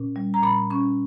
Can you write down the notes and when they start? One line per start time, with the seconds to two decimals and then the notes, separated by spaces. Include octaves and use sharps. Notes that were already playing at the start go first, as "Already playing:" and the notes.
Already playing: A#2 C#4
0.16 G3
0.34 A#5
0.42 A#2 B5
0.70 C#4 C#6